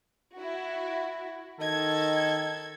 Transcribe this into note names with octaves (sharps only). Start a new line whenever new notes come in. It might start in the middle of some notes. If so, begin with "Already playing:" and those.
E4 F#4
D#3 A4 D#5 G#6